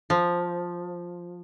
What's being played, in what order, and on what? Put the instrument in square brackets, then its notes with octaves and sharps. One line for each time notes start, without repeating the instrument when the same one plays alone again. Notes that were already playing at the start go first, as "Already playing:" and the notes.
[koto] F3